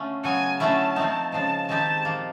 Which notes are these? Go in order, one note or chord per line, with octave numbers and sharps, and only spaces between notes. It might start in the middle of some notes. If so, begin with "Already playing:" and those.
Already playing: D3 A3 C#4 F4
C#3 F#3 B3 G#5
D3 F#3 A3 C#4 E4 A5
F3 A3 C4 D#4
C#3 F3 G#3 A5
D#3 G#3 C4 D#4 G4 A5
A#2 F3 A#3